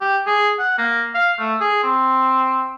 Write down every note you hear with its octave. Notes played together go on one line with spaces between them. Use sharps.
G4
G#4
F#5
A#3
F5
A3
G#4
C4